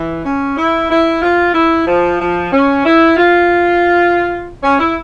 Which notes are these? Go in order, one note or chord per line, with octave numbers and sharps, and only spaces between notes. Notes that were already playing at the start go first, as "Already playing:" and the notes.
Already playing: E3
C#4
E4
E4
F4
E4
F3
F3
C#4
E4
F4
C#4
E4